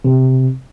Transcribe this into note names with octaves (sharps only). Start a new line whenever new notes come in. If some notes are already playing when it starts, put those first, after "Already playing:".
C3